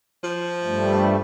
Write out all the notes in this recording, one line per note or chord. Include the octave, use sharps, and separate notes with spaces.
F3
G2 G3 A3